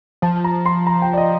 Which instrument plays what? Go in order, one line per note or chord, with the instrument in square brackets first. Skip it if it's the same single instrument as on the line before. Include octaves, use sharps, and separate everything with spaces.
[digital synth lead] F3 [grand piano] A5
[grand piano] A#5
C6
A#5
G5
D5
D#5